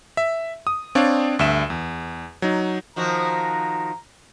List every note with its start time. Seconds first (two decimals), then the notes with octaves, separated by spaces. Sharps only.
0.17 E5
0.67 D#6
0.95 C4 D4 C#5 D5 F5
1.39 D2 G2 E5 E7
1.70 E2
2.42 F#3 D#4
2.96 D#3 F3 F#4 A#5